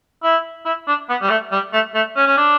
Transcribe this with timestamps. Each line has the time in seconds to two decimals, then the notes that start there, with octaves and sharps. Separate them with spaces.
0.23 E4
0.65 E4
0.87 D4
1.09 B3
1.21 G3
1.29 A3
1.52 G3
1.73 A3
1.95 A3
2.16 C#4
2.26 C#4
2.37 D4